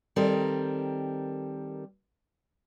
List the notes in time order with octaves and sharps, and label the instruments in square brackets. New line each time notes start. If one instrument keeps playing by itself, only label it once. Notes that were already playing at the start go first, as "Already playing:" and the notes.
[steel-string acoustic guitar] D#3 G3 C4 A4 A#4